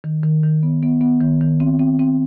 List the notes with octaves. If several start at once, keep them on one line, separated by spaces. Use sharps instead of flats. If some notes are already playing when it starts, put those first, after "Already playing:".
D#3
D#3
D#3
B3
B3
B3
D#3
D#3
C4
C4
C4